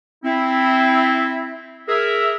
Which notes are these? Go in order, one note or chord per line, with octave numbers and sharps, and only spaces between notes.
C4 E4
G#4 A#4 E5